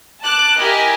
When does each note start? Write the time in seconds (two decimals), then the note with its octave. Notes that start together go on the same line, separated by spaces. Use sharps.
0.22 A5 D6 F#6
0.59 E4 G4 A#4 D#5 G#5